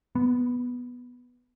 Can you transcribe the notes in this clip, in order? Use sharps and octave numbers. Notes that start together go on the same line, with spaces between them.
B3